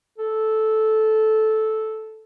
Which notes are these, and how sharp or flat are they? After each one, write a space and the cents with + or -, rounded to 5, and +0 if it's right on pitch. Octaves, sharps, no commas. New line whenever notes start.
A4 -10